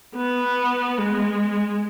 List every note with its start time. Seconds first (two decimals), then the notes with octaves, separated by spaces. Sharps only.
0.15 B3
0.98 G#3